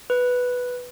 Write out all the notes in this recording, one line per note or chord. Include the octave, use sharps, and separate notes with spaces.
B4